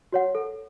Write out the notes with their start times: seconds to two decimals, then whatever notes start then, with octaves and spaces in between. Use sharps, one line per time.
0.12 F#4 C#5 F#5
0.35 A4